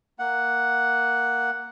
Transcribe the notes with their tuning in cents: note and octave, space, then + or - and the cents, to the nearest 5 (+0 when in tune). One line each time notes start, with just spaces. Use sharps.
A#3 +0 F#5 +0